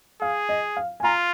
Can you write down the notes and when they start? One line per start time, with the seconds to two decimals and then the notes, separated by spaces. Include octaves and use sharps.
0.21 G#4 F5
0.49 D#5
0.77 F5
1.00 G#5
1.04 F4 A#5